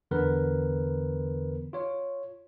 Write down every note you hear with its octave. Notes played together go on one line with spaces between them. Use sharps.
E2 D3 E3 B3 A#4 B4
F4 C#5